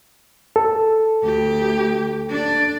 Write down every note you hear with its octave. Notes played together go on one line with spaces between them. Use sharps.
A4
D2 G4
D4 D5